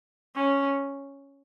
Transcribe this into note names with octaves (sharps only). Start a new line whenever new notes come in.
C#4